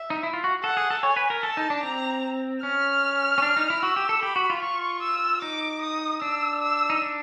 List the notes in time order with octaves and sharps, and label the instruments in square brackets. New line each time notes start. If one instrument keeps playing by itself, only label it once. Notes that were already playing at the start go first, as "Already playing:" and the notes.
Already playing: [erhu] E5
[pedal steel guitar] D#4
E4
F4
F#4
[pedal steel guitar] A4 [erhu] F#5
[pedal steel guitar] G#4
A4
[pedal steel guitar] C#5 [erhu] G#5
[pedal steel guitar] B4
A#4
[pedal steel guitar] A4 [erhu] A5
[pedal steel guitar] D#4
D4
[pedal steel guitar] C4 [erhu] A#5
[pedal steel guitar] C#4 [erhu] F6
[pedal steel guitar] C#4
D4
D#4
E4
[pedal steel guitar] F#4 [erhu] E6
[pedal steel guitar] G4
A4
[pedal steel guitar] G4 [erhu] B5
[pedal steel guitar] F#4
F4
[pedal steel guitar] F4 [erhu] C#6
[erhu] E6
[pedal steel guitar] D#4 [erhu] D6
[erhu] D#6
[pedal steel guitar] D4 [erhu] E6
[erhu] E6
[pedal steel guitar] D#4
D4